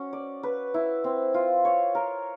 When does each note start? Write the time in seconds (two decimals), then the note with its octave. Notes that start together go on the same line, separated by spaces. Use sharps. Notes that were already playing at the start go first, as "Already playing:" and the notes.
Already playing: C#4 F#4
0.13 D5
0.43 B4
0.74 E4
1.04 C4
1.34 F4
1.65 C#5
1.95 A#4